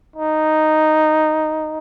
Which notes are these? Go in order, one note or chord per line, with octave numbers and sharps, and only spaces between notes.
D#4